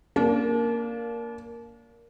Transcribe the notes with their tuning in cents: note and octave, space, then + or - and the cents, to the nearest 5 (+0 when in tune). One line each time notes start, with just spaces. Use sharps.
A#3 +0 D4 -35